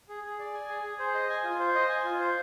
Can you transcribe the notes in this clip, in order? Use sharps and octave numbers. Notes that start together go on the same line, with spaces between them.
G#4
G#4
D5
G#5
G#4
G#4
C5
D#5
G#5
F4
C5
D#5
G#5
F4
C5